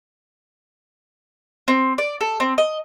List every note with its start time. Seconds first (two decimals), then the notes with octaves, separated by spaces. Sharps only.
1.68 C4
1.98 D5
2.21 A4
2.40 C4
2.58 D#5